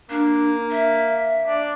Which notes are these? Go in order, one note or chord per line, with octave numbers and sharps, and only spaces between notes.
A#3 D4
E5
D4